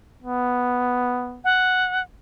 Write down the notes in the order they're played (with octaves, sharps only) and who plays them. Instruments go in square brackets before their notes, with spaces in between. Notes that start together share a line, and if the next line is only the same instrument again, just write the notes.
[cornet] B3
[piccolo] F#5